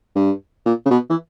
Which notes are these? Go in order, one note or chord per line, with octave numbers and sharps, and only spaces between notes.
G2
A#2
C#3
B2
E3